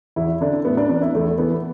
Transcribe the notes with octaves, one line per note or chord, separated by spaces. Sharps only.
E2 E4
D3 D4
A2 B3
D4
E3 D4
E4
E2 A3
E3 B3